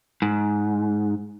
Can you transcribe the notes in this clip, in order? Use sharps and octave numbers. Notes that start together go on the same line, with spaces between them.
G#2